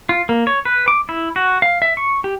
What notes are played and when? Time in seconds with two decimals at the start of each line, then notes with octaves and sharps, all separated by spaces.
0.09 F4
0.29 A#3
0.47 C#5
0.65 B4
0.88 D6
1.09 E4
1.36 F#4
1.62 F5
1.82 E5
1.97 C#6
2.24 G4